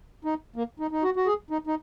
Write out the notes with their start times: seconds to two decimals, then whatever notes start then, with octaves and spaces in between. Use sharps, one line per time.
0.25 D#4
0.56 A#3
0.80 D#4
0.92 D#4
1.03 F#4
1.16 F#4
1.26 G#4
1.50 D#4
1.67 D#4